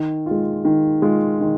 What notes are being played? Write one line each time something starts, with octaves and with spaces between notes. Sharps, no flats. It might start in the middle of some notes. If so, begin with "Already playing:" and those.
Already playing: D#3
G#3 F4
D#3
G#3 F4
D#3